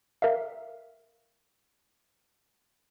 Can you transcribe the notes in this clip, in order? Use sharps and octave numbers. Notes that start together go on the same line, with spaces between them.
A#4 E5 F5